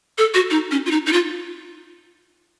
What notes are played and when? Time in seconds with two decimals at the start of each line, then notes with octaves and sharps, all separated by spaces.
0.18 A4
0.34 F#4
0.50 D#4
0.71 C#4
0.86 F4
0.91 D#4
1.06 D#4
1.13 F4